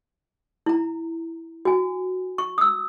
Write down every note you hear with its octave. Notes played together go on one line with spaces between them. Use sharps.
E4 A#5
F#4 G#5
C#6
D#6 E6